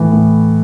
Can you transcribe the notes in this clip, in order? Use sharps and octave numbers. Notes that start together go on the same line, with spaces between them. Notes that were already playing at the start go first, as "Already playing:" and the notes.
Already playing: A2 E3 A3
A2